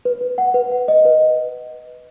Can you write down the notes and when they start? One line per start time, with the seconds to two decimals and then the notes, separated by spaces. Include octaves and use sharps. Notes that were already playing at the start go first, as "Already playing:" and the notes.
0.05 B4
0.21 B4
0.38 F#5
0.54 B4
0.72 F#5
0.88 D#5
1.05 B4